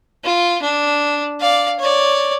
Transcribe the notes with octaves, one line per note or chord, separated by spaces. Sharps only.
F4
D4
D5 F5
C#5 D5